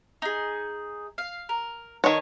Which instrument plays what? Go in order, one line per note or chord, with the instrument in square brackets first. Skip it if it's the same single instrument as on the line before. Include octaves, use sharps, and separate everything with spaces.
[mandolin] D#4 G#4
F5
A#4
[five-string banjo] D#3 C#5 [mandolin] A5